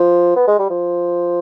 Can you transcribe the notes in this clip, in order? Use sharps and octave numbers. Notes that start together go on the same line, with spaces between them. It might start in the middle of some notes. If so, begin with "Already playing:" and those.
Already playing: F3
B3
G#3
G3
F3